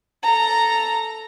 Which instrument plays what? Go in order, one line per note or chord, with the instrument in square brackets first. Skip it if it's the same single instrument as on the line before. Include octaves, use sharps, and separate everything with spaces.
[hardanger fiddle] A4 A#5